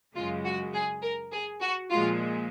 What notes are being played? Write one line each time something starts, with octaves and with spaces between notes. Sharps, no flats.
F#2 C#3 G#3 F4
F#4
G#4
A#4
G#4
F#4
A#2 F3 G#3 F4